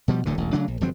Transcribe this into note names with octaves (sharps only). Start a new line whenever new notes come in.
B2 F3 G3
D1 D2 A2 D3
E1 A1
C#3 F#3 A3 D4
A#1
G1 F3 F#3 C4